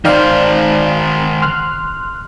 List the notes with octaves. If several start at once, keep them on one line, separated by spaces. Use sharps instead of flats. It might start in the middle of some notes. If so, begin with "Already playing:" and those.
D#3 D#4 C5 D5 F5
C6 F6 F#6